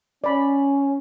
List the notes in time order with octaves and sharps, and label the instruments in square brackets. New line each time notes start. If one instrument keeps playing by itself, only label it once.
[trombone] C#4 [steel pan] D5 B5